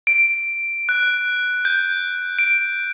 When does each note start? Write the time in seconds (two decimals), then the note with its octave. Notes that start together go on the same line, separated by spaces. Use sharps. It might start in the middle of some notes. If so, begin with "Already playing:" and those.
0.07 D7
0.89 F#6
1.65 G6
2.39 D7